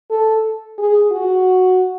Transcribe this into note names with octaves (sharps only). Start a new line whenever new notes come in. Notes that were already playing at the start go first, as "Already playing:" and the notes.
A4
G#4
F#4